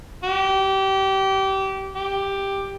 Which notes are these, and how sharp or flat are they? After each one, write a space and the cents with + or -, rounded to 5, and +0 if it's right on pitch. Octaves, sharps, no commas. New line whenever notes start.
G4 -25
G4 +5